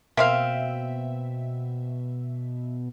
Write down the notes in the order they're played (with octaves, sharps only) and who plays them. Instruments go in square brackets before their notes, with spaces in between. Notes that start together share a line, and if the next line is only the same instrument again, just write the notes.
[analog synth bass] B2 [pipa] A#3 C4 F5 [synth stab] E5